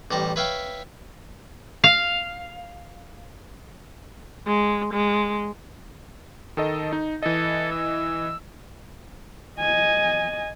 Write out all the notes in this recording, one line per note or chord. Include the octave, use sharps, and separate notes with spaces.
A1 G3 A5 A#5
B4 C#5 E5 F5 G5
F5
G#3
G#3
D#3 A4 D#5
D#4
E3 A4 D#5
E6
D#5 G#5